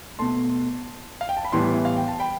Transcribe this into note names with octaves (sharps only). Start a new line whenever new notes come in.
B2 A3 A5 C6
F5
G5
A5
B5
A2 E3 G3 B3 A5 C6
E5
F5
G5
A5
G5 B5